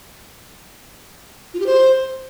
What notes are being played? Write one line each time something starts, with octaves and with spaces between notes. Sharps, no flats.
F4
G4
C5